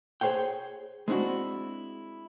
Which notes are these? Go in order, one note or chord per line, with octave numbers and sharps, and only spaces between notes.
G#4 A4 C5 C#5 G5
G#3 C4 D4 E4 F#4